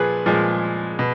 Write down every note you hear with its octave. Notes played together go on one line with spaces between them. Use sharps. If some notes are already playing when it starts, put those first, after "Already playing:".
Already playing: A#2 F3 G#4 B4
A#2 F3 G#3
B2